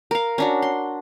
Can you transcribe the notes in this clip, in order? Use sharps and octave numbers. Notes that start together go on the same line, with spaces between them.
A#4 F5
C#4 D4 F#4
C6